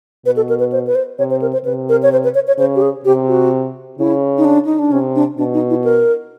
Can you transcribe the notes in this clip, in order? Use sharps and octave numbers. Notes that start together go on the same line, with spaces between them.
B2 B4
A4
A#4
B4
C5
B4
C5
C3 C#5
C5
A#4
C5
C3 B4
A#4
C#5
C5
B4
C#5
C#5
C#3 C5
G4
G#4
C3 G4
F#4
C#3 E4
D#4
D4
D#4
D4
C3 C#4
D4
B2 D4
D#4
E4
A#4